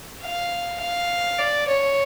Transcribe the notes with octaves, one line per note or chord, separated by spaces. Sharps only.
F5
F5
D5
C#5